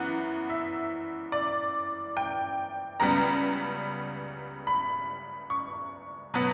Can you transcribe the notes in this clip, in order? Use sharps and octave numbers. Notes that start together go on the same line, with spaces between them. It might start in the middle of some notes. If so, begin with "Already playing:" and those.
Already playing: F#2 E3 B3 F#5
E5
D5
G5
C#2 C#3 G3 B3 A#5
B5
C#6
B2 F#3 B3